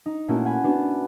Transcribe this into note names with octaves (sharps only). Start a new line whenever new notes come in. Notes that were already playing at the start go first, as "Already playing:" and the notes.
D#4
A#2 A3 A#3 C#4 E4 F#4
F#5 G#5 B5
B3 D4 F#4